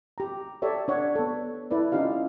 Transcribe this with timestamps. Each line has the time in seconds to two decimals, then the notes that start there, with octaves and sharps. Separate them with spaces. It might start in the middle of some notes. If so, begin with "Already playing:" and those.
0.18 G4 A#5
0.62 G4 A4 C#5 D5 E5
0.88 D4 C#5 F#5
1.16 B3 A4
1.71 E4 A4 B4 D5
1.92 C#4 D#4 F4 G4 F5